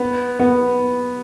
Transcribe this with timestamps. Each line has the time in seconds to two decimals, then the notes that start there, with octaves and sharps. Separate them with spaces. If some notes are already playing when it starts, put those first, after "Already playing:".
Already playing: B3
0.39 B3